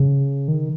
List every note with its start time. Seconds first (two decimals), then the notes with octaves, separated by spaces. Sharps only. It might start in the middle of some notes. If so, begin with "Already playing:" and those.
Already playing: C#3
0.48 D#3